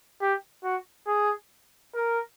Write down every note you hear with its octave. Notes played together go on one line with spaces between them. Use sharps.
G4
F#4
G#4
A#4